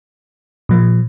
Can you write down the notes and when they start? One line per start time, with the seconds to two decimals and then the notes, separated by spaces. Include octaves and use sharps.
0.69 A#2 F3